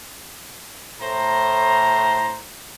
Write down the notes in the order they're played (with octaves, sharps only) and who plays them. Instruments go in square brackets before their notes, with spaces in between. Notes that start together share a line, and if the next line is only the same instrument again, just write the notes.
[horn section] A2 C5 A#5